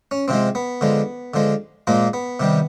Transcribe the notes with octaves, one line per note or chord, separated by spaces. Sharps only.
C#4
C3 F3 G#3 C4
B3
D3 F3 G#3
D3 F3 G#3
A#2 F3 G#3 A#3
B3
C3 D#3 G3